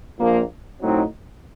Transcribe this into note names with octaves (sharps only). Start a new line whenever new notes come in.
A#1 A#2 F3 A#3
A2 F#3 C4 D#4